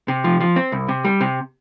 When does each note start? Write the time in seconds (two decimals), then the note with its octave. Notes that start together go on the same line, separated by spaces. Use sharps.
0.08 C3
0.24 F3
0.40 F3
0.56 C4
0.72 C2
0.89 C3
1.05 G3
1.21 C3